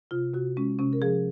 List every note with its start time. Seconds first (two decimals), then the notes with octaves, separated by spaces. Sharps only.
0.11 C3 F4
0.34 C3 F#4
0.57 G#3 C#4
0.79 C3 C#4
0.93 A#4
1.02 F3 G#4